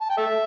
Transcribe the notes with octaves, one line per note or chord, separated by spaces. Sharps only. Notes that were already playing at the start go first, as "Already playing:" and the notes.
A5
G5
A4 E5